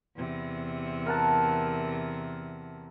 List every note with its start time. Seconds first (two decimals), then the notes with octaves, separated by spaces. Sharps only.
0.16 E2 C3
1.06 A#4 F#5 A5